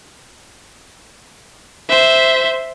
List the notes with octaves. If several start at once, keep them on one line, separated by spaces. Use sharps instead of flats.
C5 E5